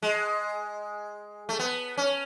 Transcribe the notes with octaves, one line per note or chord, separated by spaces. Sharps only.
G#3
A3
B3
C#4